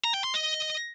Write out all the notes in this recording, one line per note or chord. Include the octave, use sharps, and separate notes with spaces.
A#5
G5
C6
D#5